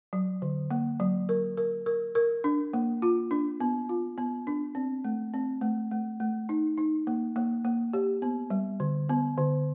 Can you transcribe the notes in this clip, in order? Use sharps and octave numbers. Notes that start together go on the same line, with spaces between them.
F#3
D3
A#3
F#3
A#4
A#4
A#4
A#4
D4
A#3
F4
D4
B3
F4
B3
D4
C4
A3
C4
A3
A3
A3
D#4
D#4
A#3
A#3
A#3
G4
B3
G3
D3
B3
D3